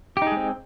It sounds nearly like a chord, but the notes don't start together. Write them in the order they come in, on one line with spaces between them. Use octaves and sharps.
G4 D#4 G#4 G#3 C4